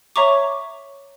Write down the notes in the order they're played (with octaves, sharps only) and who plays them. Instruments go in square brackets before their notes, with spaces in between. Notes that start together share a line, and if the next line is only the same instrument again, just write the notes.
[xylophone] C#5 E5 A#5 C#6 D6